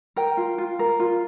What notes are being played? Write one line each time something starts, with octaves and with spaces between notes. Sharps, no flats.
A#4 G5
F4
F4
A#4
F4